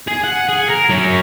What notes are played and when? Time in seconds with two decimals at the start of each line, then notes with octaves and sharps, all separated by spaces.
0.08 G#4
0.24 F#5
0.49 G#4
0.70 A#4
0.90 F#3 C#4